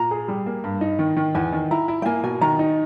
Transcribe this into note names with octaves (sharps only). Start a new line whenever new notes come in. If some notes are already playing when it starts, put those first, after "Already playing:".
Already playing: A#2 A#5
G#4
G3
A#3
G2
D#4
D#3
D#3
E2 G#5
D#3
E4 A#5
E4
G5
A#3 G#5
B2 G#5
D#3 A#5
D#4